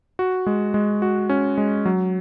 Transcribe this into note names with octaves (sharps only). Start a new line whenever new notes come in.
F#4
G#3
G#3
F#4
C#4
G#3
F#3